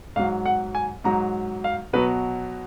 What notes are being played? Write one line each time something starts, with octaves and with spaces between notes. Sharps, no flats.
G#2 F#3 F5
F#5
G#5
G#2 F#3 A#5
F5
B2 F#3 B4